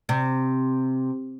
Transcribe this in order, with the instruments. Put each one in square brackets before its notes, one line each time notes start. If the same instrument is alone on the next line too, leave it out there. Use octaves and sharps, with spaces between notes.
[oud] C3